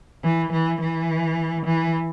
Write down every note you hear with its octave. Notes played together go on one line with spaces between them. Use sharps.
E3
E3
E3
E3